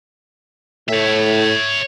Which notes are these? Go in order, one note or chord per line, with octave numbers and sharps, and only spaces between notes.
A2 C#5 E5